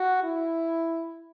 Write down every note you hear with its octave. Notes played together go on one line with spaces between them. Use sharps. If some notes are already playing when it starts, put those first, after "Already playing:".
Already playing: F#4
E4